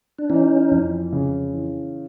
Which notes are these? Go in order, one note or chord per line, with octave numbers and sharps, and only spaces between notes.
D4
E3 C#4 D#4
F2
C#3
E3